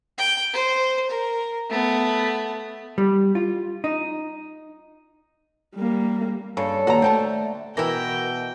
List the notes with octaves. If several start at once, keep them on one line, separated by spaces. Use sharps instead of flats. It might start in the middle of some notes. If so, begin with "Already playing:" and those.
G5
C5
A#4
A3 B3
G3
F4
D#4
G3 A#3
G2 C#3 A4 C#5
D#2 D3 F#4 B4 A#5
A3 C5 G5 A5
B2 E3 E4 A#4 G5 A#6